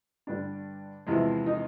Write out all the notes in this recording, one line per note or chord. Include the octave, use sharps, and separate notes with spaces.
G2 D3 G3 D4
E2 C3 F3 G#3 E4
D#4